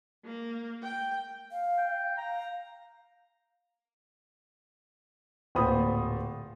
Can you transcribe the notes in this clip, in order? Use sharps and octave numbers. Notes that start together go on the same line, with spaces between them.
A#3
G5
F5
G5
F5 A#5
D1 A#2 C5 B5 D#6